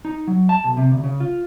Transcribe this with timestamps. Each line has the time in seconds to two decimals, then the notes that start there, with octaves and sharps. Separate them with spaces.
0.05 D#4
0.27 F#3
0.49 A5
0.64 B1
0.77 C3
0.91 D2
1.04 C#3
1.20 F4